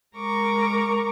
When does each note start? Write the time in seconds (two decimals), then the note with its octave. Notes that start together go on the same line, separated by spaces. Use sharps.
0.17 G#3 A#4 A#5 C#6 D6